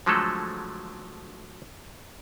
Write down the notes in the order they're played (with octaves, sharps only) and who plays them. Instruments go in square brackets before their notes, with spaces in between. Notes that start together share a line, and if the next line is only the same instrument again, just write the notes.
[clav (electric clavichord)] D3 F3 F#3 G#3 A3 A4